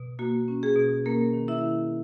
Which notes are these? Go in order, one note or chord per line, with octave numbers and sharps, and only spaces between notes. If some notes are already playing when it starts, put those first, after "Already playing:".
Already playing: B2
A#3 F#4
C#4
G#4
B2
A#3 C#4 A#4
D#3
E4 E5
D#3